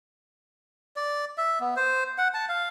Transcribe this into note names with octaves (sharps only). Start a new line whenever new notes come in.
D5
E5
B3
C5
F#5
A5
F5